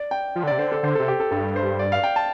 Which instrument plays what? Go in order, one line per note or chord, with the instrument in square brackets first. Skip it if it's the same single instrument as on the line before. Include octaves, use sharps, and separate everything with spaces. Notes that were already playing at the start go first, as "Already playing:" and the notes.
Already playing: [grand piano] D5
G5
[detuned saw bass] F3
D3
[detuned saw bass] C3 [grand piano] D5
[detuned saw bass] D3 [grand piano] C5
[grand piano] A4
[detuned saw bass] D3 [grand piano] C5
[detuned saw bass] C3 [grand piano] A4
[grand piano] G4
A4
[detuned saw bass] G2 [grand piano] A4
[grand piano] C5
D5
F5
G5
A5